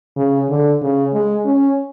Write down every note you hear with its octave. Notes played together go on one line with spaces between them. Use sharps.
C#3
D3
C#3
G#3
C#4